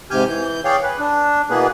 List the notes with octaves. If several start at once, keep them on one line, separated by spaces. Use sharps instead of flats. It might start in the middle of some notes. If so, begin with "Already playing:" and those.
G#2 C3 G4 G#5 F6 G6
E3 G6
G#4 C#5 D5 F5 G5
B4
D4
B2 E3 A#3 B3 G#4 B4